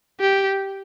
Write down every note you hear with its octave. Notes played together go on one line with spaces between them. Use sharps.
G4